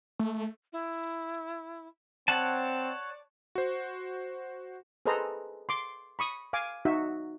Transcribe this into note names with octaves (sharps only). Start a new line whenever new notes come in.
A3
E4
C4 C#5 D5 F#5 A5
F#4 C5
G#4 A4 B4 C5 D#5 A#5
C6 D6
B5 C#6 D#6
F5 G#5 D6
D#4 F#4 E5